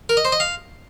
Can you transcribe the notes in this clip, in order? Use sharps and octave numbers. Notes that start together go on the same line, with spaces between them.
A#4
D#5
C5
D#5
F5